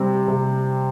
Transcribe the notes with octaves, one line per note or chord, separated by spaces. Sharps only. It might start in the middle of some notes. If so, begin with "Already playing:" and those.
Already playing: C3 G3 C4
C3